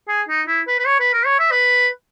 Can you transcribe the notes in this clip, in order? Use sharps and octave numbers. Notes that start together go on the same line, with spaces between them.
G#4
D#4
E4
B4
B4
C#5
B4
A#4
C#5
E5
B4